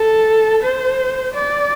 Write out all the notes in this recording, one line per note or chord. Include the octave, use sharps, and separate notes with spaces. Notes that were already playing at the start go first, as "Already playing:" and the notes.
Already playing: A4
C5
D5